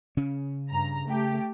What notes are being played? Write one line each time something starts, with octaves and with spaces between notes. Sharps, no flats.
C#3 C#4
G2 A#5
A3 G4